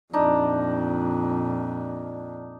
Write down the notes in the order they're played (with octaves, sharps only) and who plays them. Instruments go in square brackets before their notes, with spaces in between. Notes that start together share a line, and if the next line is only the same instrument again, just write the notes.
[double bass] F2 A#2 [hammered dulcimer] D4 D#4